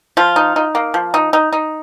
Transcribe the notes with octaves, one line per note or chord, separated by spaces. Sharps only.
F3 F4
D#4
D#4
A#3
F3
D#4
D#4
D#4